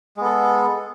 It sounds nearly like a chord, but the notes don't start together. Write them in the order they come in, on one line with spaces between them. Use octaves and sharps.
G#3 B3 A4